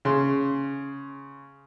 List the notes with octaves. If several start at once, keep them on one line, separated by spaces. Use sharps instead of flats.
C#3 C6